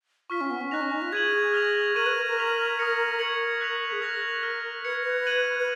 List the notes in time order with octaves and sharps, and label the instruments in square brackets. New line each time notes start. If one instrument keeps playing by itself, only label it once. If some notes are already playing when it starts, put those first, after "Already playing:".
[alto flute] F4 [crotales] C#6 F6 B6
[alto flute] C#4
B3
C#4
[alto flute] D#4 [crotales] F#6 A#6 F7
[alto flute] C#4
D#4
F4
[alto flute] G#4 [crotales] G#6 D#7 F#7
[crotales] F6 A#6 F7
[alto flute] A#4 [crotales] C#6 G#6 D#7 F#7
[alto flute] B4
A#4
A#4
[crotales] C#6 F6 B6 F7
D#6 A#6 C#7 F7
[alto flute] A#4 [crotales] C#6 G#6 C#7 F#7
[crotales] F#6 B6 F7
[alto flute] G#4
[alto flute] A#4 [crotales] F#6 A#6 F7
[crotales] F6 A#6 F7
[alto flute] B4 [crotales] G#6 C#7 F7
[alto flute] B4
[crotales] G#6 D#7 F#7
[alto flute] B4